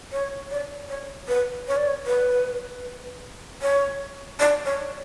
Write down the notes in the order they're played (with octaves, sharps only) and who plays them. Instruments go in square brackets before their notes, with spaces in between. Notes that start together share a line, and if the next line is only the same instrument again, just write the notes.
[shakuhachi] C#5
D5
C#5
B4
C#5
D5
C#5
B4
C#5
D5
C#5